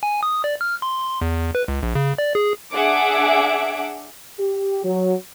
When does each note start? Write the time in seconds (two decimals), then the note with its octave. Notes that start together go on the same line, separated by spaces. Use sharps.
0.03 G#5
0.23 D#6
0.44 D5
0.61 F6
0.82 C6
1.21 E2
1.55 B4
1.68 C#2
1.83 A#1
1.95 C#3
2.18 D5
2.35 G#4
2.72 D4 G#4 E5 F#5 D6 D7
4.40 G4
4.84 F#3